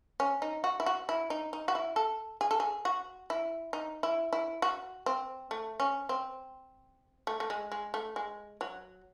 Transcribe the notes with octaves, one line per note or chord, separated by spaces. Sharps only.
C#4
D#4
F#4
E4
F#4
E4
D#4
D#4
F#4
E4
A4
G#4
A4
G#4
F#4
E4
D#4
E4
E4
F#4
C4
A3
C#4
C4
A3
A3
G#3
G#3
A3
G#3
F#3